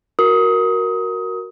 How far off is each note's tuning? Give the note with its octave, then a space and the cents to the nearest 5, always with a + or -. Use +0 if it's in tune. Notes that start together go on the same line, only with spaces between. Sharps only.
F#4 +0 A#4 +0 D#6 +20